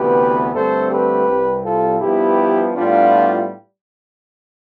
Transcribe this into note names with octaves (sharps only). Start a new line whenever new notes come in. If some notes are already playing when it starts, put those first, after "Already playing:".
Already playing: D2 C3 E3 B3 G4 B4
G2 D3 A3 C4 A4 C5
G4 B4
C2 C3 G3
F4 A4
G2 F3 B3 E4 G4
A2 G3 B3 D4 F4